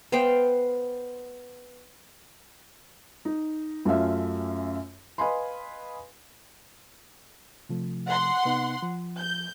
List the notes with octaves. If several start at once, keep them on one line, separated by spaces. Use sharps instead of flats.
B3 C5 F5 G5
D#4
F#2 A3 C#4 F4 E5
B4 D#5 F5 G#5 B5 C6
C3 F3 A3
F#5 C6
C3 B3 D#4
F3
G6